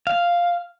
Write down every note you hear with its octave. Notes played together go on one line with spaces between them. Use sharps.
F5